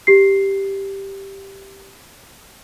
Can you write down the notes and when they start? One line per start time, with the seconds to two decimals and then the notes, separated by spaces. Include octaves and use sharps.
0.07 G4 C7